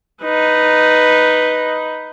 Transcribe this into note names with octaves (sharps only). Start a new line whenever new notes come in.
D#4 B4